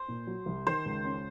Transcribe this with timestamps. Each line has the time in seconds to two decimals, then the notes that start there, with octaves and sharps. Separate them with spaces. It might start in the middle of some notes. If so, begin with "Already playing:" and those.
Already playing: C5
0.08 A#2
0.27 F#3
0.46 C2
0.66 D#3 C5
0.86 C#2
1.05 C#4